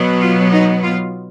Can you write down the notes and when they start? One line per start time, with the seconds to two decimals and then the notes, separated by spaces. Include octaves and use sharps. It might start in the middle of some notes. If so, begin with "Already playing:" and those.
Already playing: B2 F#3 B3
0.20 F4
0.52 D#4
0.84 F4